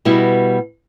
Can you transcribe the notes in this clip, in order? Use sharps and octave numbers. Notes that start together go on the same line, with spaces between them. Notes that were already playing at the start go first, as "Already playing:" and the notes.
B2 G3 B3 E4 F#4